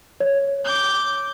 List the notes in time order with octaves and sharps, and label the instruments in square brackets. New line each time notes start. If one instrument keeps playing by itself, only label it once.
[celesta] C#5
[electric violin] D6 G6